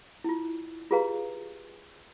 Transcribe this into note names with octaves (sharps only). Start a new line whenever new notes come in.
E4 F4
F4 G4 G#4 B4 F5 A#5